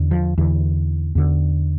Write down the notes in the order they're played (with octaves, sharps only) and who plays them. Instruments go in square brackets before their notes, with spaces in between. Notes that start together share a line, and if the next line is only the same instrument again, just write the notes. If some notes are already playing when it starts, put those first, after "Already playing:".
Already playing: [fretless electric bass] E2 D3
F3
E2 D3 E3
E2 D3